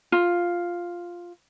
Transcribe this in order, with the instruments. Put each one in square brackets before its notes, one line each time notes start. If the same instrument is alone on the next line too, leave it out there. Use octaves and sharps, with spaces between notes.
[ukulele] F4